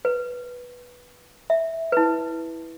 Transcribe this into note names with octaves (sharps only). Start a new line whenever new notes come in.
B4
E5
E4 B4